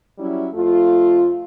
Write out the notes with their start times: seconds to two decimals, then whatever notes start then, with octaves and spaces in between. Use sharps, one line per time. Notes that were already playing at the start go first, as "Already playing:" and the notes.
0.18 F#3 G3 C#4 E4
0.54 F2 A3 F4